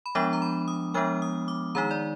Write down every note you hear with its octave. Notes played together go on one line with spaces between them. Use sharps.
B5
F3 G#3 B3 D4 D6
A#5
B5
D#6
F3 G#3 B3 D4 F6
D#6
D6
D#3 G#3 D#4 A#5
D5